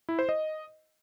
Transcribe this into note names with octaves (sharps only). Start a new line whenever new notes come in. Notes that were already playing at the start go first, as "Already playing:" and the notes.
E4
C5
D#5